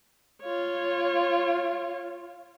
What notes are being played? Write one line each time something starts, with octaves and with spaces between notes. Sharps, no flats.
F4 C#5